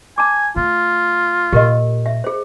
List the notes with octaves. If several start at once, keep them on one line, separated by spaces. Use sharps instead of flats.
G#5 A5 D6
A3 F4
A#2 G4 A#4 D#5
E5
G#4 C5